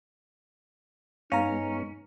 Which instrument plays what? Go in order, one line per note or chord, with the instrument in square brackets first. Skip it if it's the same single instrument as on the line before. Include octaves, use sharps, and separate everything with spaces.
[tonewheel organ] G2 G#3 B3 [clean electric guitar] C#4 [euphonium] D#4 [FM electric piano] F5 A#5